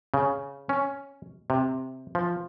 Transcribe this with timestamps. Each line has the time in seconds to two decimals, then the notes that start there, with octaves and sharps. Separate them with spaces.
0.14 C#3
0.69 C#4
1.50 C3
2.15 F3